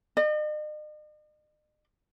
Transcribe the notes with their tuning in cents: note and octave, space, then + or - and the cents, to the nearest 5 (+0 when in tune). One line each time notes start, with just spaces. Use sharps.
D#5 -45